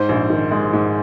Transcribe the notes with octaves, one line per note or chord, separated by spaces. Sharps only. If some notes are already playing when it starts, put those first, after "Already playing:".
Already playing: G#2 C5
A#1
D#3
G#3
G#2